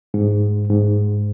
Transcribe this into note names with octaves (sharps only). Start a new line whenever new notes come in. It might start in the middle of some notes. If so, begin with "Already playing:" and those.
G#2
G#2